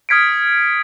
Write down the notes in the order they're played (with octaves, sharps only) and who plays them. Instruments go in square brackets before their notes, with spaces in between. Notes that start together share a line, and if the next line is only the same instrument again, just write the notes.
[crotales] D#6 F6 G#6 B6 C#7 D7